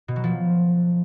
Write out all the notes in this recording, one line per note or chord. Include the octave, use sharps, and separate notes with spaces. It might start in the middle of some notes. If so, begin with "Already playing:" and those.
B2
F#3
F3